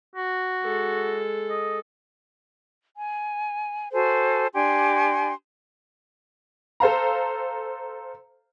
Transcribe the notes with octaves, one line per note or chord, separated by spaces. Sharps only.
F#4
G#3 A4
D#5
G#5
F#4 A4 C5 G#5
D4 G4 G#5 C6
A4 C5 F5 A#5